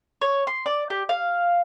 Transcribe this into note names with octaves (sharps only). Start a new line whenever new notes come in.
C#5
C6
D5
G4
F5